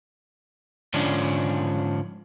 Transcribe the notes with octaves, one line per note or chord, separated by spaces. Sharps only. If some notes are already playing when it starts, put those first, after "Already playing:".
G#2 D3 F3 C#4 D4